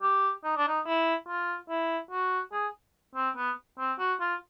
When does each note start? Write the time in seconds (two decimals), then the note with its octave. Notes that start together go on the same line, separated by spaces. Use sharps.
0.02 G4
0.44 D#4
0.57 D4
0.68 D#4
0.85 E4
1.28 F4
1.69 E4
2.11 F#4
2.53 G#4
3.15 C4
3.37 B3
3.79 C4
3.99 F#4
4.20 F4